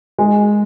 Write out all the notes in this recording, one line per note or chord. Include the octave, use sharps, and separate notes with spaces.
G#3